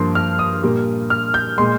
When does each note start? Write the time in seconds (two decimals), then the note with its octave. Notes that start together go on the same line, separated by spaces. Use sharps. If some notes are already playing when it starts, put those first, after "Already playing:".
Already playing: G2 F3 A#3 C6
0.15 F6
0.39 D#6
0.63 A#2 G3 A#3
1.10 F6
1.34 G6
1.58 A#2 G#3 C6